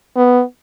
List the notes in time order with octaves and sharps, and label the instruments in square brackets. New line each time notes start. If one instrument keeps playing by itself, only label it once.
[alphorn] B3